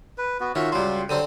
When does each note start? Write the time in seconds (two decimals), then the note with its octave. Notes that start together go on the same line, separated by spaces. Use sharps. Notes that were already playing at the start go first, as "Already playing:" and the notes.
0.18 B4
0.40 B3 F#4 B4
0.55 D#3 C#4 F4 F#4 E5
0.72 C#2 F#3 G3 F4 G4 C6
1.09 D3 F#3 G3 C4 D4 C5 D#7